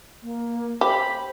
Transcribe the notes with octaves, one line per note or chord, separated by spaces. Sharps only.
A#3
G4 C5 B5